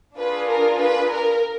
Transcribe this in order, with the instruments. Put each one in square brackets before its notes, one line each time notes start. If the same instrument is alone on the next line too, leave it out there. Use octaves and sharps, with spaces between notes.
[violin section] D4 F4 G#4 B4
A#4
B4
A#4